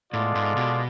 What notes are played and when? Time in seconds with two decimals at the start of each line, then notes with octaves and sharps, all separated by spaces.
0.13 A2 G#3 B3 F4 A4 D5
0.35 G#2
0.57 B2